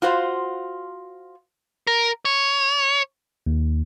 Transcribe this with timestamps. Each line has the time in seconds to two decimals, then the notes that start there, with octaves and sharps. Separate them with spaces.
0.02 F4 F#4 C5 F5
1.87 A#4
2.25 C#5
3.47 D#2